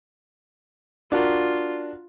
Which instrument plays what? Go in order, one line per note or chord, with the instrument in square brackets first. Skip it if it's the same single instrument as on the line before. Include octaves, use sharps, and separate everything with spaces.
[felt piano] D4 F#4 A#4 [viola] F4